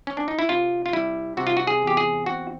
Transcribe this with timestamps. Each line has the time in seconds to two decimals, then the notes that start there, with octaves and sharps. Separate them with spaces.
0.07 C#4
0.17 D4
0.28 D#4
0.39 E4
0.49 C3 F4
0.86 F4
0.93 G3 E4
1.37 C3 F#4
1.47 F4
1.57 F#4
1.67 G#4
1.82 E2
1.87 G4
1.97 G#4
2.26 C4 F#4